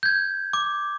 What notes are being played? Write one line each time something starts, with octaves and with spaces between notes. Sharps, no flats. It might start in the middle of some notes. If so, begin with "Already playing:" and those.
G6 G#6
D6